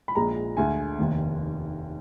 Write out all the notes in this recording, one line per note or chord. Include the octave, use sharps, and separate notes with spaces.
B5
A#1 A#2 G#3 A#5
D2 D3 G#3 G#5
F1 D#2 D#3